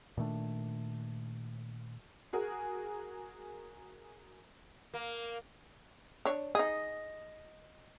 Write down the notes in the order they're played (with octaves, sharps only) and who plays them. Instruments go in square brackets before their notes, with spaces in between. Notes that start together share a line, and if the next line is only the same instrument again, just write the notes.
[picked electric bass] A#2 D#3 A3 D4
[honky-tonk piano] F#4 G#4 A#4 G#5
[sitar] A#3
[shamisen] D4 C#5
[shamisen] D#4 G#4 [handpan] D#5